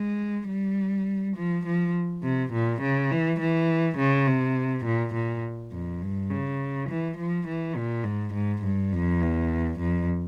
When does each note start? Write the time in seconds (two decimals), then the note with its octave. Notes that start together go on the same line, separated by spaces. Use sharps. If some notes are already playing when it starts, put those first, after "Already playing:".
Already playing: G#3
0.49 G3
1.36 F3
1.65 F3
2.23 C3
2.53 A#2
2.81 C#3
3.11 E3
3.39 E3
3.97 C#3
4.27 C3
4.85 A#2
5.13 A#2
5.72 F2
6.02 G2
6.30 C#3
6.88 E3
7.17 F3
7.47 E3
7.76 A#2
8.04 G#2
8.33 G#2
8.63 G2
8.92 F2
9.21 E2
9.79 F2